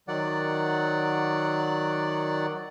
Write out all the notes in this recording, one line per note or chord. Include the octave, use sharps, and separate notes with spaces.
D#3 F#3 D5 F#5